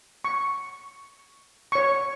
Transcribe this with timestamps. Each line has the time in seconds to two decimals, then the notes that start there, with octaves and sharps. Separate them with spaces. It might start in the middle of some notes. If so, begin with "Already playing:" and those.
0.24 C#6
1.72 C#5 C#6